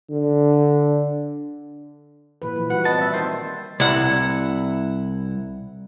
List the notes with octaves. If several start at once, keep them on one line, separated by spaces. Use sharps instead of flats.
D3
A#2 E3 B4
F3
G3 F#4 B4 F#5
C4 B4 D#5 A5
E5
D#3 C5
C2 E4 F#5